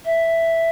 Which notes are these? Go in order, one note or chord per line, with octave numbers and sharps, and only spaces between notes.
E5